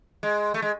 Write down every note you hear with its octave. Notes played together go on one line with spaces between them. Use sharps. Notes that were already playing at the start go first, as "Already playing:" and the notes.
G#3
A3
G#3